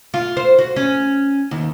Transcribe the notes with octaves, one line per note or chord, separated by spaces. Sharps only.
F4
C5
F#4
C#4
D#2